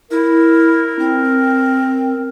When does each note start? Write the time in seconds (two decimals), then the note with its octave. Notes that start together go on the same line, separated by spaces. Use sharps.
0.11 E4 A#4
0.99 C4